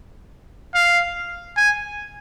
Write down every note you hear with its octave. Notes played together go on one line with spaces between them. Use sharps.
F5
G#5